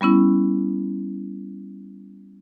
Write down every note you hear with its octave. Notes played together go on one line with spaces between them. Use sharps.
G3 B3 C#4 E4